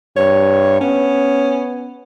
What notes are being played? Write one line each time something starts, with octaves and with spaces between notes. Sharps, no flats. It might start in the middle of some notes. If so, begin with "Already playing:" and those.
G2 C#5
B3 C#4